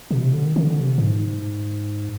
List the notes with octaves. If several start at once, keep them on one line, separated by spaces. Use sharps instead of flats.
B2
C3
D3
D#3
D#3
D3
C3
G#2